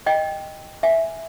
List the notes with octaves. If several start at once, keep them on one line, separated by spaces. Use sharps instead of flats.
D#5 G5
E5 G#5